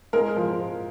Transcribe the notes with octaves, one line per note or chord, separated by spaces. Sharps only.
G#3 A#4
F3